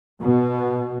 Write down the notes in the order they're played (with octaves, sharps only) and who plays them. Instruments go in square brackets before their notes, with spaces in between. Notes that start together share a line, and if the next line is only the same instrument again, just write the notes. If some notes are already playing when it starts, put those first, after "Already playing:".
[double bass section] B2